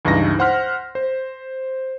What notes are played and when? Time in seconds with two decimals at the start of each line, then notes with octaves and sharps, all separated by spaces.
0.05 C#2 G2 E3 D#4 A#6
0.39 C5 F#5 C6 F6 B6
0.95 C5